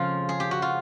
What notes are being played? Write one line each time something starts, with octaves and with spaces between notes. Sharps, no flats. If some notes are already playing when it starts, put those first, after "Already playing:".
Already playing: F2 C#3 F3 G#3 F4
G#4
G4
F#4
F4